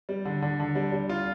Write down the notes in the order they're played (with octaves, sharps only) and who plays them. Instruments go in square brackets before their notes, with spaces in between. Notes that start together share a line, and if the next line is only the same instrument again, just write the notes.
[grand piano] G3
D3
D3
D3
G3
G3
F4